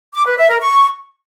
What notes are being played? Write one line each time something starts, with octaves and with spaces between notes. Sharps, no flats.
D6
B4
E5
A#4
C#6